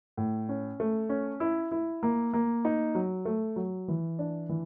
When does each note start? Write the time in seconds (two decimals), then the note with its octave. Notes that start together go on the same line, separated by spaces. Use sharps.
0.17 A2
0.49 C#4
0.80 A3
1.09 C#4
1.40 E4
1.71 E4
2.03 A#3
2.33 A#3
2.65 D#4
2.95 F#3
3.25 A3
3.56 F#3
3.88 E3
4.19 D4
4.49 E3